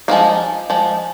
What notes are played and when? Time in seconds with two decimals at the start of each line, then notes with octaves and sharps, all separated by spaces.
0.08 F3 G#3 C4 D#4 F5
0.70 F3 G#3